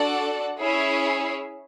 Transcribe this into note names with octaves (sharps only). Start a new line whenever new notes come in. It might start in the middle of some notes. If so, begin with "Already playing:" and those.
Already playing: D4 F#4 A4 D5 F#5
C#4 E4 G#4 C#5 E5